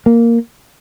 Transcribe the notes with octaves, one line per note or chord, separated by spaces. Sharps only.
A#3